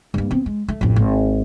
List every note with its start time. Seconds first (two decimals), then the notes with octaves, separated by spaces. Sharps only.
0.14 G2 A#3
0.31 B3 C4
0.46 G#3
0.68 A3
0.81 A1 F2
0.96 G#1